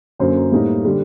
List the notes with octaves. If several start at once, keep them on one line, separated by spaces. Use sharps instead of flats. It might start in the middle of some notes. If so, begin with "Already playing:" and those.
F#2 D3 F#3 A#3 C5
A2 G3 A#3 D#4
D3 G3